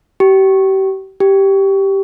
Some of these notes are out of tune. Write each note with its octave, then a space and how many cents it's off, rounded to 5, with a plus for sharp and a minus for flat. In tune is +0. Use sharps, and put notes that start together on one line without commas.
G4 -35
G4 -5